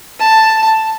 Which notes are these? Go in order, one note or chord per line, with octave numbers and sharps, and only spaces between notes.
A5